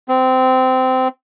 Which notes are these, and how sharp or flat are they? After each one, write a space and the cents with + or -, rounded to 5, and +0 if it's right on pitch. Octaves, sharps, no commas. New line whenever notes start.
C4 -20